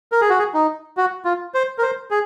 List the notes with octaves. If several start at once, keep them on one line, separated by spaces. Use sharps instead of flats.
A#4
G#4
F#4
G#4
D#4
F#4
F4
C5
A#4
C5
G#4